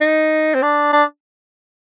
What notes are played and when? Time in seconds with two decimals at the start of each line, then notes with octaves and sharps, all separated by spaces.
0.01 D#4
0.55 C4
0.62 D4
0.93 D4